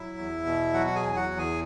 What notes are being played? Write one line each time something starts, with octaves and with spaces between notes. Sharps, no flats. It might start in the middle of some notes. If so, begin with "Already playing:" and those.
Already playing: F#3 E4 E5
E2
B2
F#3 F#4 F#5
F#5
G#4 G#5
E2
G#5
F#4 F#5
E2
G#4 G#5